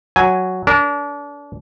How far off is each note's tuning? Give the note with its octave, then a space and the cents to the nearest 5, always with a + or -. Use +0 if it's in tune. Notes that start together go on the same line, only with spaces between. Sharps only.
F#3 +0 G#5 +0
D4 -30 A#4 +0